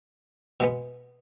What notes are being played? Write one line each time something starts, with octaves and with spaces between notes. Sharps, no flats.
B2 G#3 B3